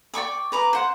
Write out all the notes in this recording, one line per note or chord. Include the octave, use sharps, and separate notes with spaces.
D5 G5 C#6 D6
B4 A#5 D6
C5 F#5